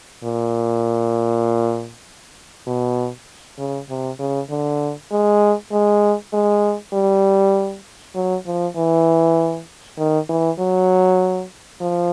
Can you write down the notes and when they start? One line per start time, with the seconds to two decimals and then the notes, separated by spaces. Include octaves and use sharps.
0.23 A#2
2.67 B2
3.58 C#3
3.89 C3
4.19 C#3
4.50 D3
5.11 G#3
5.72 G#3
6.33 G#3
6.93 G3
8.15 F#3
8.46 F3
8.76 E3
9.98 D#3
10.29 E3
10.59 F#3
11.81 F3